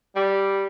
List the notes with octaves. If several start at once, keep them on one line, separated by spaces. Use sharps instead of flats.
G3